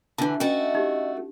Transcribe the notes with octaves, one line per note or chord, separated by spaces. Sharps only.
D3 E3 D4 A5
A3 C#4 F#4 D#5
D#4 G4